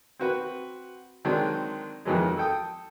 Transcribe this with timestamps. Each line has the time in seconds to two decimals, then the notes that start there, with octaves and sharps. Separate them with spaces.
0.19 C4 F#4 B4
1.25 D3 D#3 F#3 G#3 C4 D4
2.05 F2 D#3 E3 F#3 G#3
2.37 A4 G5 D#6